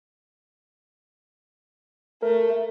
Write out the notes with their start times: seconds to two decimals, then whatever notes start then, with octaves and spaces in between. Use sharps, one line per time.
2.22 A3 A#4